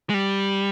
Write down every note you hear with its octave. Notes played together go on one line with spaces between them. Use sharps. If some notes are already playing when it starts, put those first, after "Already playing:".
G#3
G3